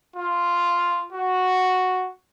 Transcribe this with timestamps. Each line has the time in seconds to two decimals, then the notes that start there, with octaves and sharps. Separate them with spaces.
0.16 F4
1.13 F#4